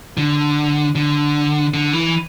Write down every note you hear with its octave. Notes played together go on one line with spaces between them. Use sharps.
D3
D3
D3
E3